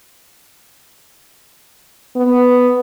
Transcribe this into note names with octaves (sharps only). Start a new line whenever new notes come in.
B3